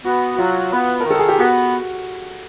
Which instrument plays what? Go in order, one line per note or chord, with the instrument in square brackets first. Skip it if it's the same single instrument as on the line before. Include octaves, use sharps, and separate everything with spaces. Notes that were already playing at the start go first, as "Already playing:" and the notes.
[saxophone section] B3 [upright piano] F#4
[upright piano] F#4
[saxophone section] F#3 [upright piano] F4
[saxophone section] B3
[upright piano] A#4
[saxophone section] D#3
[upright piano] A4
G#4
G4
[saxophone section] B3 [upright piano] F#4